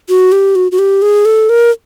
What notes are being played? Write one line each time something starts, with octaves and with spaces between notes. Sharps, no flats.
F#4
G4
F#4
F#4
G4
G#4
A4
A#4